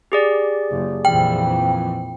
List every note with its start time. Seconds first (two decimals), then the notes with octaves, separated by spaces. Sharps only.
0.12 G4 G#4 D5
0.70 F#1
1.05 A#1 F2 E3 G5